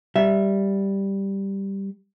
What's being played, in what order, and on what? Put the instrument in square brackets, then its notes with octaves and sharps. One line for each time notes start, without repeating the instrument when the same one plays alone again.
[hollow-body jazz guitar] G3 E5